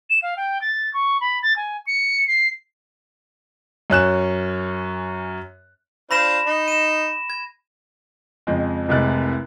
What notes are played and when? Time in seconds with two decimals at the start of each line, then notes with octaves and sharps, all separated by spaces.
0.10 E7
0.23 F5
0.37 G5
0.62 A6
0.94 C#6
1.21 B5
1.43 A6
1.56 G#5
1.87 C#7
2.28 C7
3.90 F#2 C#4 F#6 E7
6.11 D4 F4 C5 B5 A#6 E7
6.46 D#4
6.68 D#7 E7
7.30 G#6
8.47 F2 C#3 F3 G#3 C4
8.88 F1 C2 C3 G#3 F#6 A6